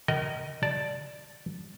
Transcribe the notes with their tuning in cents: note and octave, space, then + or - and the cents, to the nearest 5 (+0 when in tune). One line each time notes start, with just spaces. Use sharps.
A#4 +0 D#5 +5 G5 -40
D5 +0 A5 +0